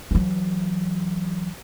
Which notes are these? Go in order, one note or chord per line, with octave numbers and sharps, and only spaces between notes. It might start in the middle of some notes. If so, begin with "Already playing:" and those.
E3 F#3